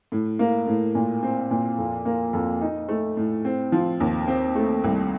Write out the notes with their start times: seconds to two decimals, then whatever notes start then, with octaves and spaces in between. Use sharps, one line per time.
0.12 A2
0.39 A#3
0.67 A2
0.95 A#2
1.23 C4
1.51 A#2
1.78 F2
2.05 A#3
2.33 F2
2.61 D#4
2.89 A3
3.17 A2
3.45 C4
3.72 F3
4.00 D#2
4.28 C4
4.55 A3
4.84 C2